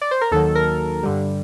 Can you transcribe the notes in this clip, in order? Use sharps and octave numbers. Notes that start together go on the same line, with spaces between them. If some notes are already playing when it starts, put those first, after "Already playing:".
D5
C5
A#4
D#2 D#3 F#3 A4
A#4
G2 D3 G3